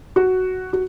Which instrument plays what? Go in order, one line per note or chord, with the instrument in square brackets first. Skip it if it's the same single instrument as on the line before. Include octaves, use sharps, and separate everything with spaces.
[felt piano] F#4
F#4